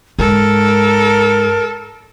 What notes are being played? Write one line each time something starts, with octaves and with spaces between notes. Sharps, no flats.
G#2 A4 A#4